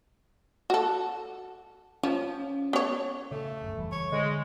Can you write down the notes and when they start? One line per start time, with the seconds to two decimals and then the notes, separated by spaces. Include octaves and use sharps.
0.70 F#4 A4
2.03 F3 C#4
2.73 B3 C#5
3.31 C#3 A3
3.61 D1 F#2
3.75 F1 E3 G3
3.92 C#5
4.12 D3 G#3